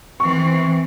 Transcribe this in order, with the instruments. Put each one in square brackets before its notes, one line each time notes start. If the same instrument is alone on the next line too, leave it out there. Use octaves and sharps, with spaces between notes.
[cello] E3 C4 [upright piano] C#6